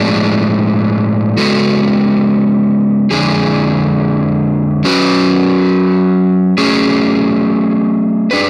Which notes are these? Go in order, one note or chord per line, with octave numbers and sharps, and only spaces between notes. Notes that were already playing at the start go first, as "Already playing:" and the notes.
Already playing: A2 F3 G#3 D4
C#3 G#3 B3 F#4 A4
F2 D3 G#3 D4 G#4
F#3 C#4 F#4 B4
F#3 A3 C#4 G#4
D4 G#4 B4